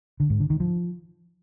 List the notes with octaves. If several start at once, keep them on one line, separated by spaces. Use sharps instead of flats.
D3
G#2
D3
D#3
F3